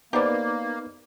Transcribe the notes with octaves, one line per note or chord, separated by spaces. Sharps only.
A#3 B3 D#4 G4 B4 C5 D5